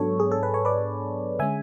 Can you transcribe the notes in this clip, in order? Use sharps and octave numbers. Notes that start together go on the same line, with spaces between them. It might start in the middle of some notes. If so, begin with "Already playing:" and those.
Already playing: G#2 F#3 B3 D4 A4 C#5
G#4
A4
B4
C#5
B4 D5
D3 G#3 C#4 E5 G#5